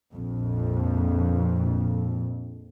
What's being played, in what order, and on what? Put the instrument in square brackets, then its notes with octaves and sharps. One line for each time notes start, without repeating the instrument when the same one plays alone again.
[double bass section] A#1 F2